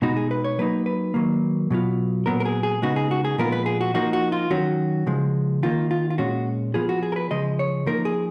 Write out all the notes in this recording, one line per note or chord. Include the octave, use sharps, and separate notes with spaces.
B2 G#3 B3 D#4 F#4
G#4
B4
C#5
F#3 A#3 D#4 B4
B4
D#3 F#3 A#3
B2 F#3 B3 F4
A#2 F#3 B3 A#4
A#4
G#4
G#4
C#3 G#3 B3 D#4 F#4
G#4
F#4
G#4
A#2 F3 G#3 B3 F4 A#4
B4
G#4
F#4
F3 A#3 D#4 F#4
F#4
F4
D#3 F#3 C#4 F#4
C#3 F3 G#3
D#3 A#3 D#4 F4
F4
F4
A#2 G#3 C#4 F#4
F3 B3 F4 G#4
F#4
G#4
A#4
B4
C#3 F3 G#3 D#5
C#5
F3 A#3 D#4 A#4
G#4